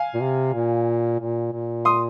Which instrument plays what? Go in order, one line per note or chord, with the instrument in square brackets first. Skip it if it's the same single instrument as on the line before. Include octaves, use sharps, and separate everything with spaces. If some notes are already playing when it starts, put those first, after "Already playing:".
Already playing: [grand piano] F5 G#5
[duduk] A#2
C3
A#2
A#2
A#2
[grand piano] C6 D#6